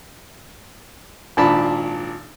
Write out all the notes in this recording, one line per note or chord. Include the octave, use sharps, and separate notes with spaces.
G#1 A#2 D4 A5 B5